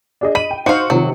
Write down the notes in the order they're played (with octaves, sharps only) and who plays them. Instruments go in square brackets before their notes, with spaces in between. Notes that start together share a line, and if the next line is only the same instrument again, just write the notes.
[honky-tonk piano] D4 G#4 D#5
[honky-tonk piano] D#5 D#7 [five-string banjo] B5
[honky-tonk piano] G5
[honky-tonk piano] D#4 C5 C#7 [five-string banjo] F#4 F5
[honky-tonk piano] C3 D#3 F3 [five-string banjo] F#3